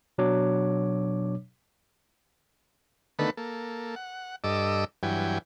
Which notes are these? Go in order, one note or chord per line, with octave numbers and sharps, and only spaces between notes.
B2 F#3 D4 C#5 D6
D3 D#3 A3 B3 A4 B4
A#3 A4
F#5
G2 A4 D#5 D6 E6
G2 E3 F#3 G5 G#5